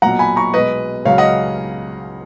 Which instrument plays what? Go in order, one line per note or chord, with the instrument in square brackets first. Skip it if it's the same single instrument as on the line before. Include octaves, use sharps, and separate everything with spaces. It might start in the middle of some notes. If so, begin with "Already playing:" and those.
[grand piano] B1 A#2 F#3 F#5 A#5
G#5 B5
A#5 C#6
B1 B2 G#3 B4 D#5
C#2 C#3 F#3 C#5 F5
D#5 F#5